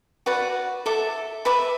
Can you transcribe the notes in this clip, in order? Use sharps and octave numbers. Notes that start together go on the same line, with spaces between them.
F#4 B4 D5 F#5
A4 E5 D6
B4 E5 B5 D6